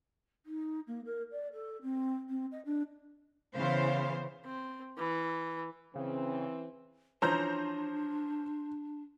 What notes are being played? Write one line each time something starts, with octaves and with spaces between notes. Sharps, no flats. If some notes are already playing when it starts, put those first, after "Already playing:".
D#4
A#3
A#4
D5
A4
C4
C4
D#5
D4
C#3 E3 B3 C5 F5
C4
E3
C#3 E3 C4
E3 F3 C#4 D4 C5 A#5 G6